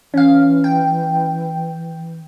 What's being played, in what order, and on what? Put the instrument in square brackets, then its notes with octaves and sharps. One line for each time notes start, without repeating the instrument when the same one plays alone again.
[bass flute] E3 [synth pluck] C#4 F5
[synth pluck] G5